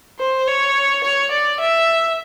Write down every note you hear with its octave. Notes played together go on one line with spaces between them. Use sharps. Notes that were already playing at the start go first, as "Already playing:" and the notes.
C5
C#5
C#5
D5
E5